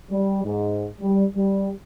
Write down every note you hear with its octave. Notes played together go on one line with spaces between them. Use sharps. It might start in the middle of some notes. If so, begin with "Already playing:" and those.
G3
G#2
G3
G3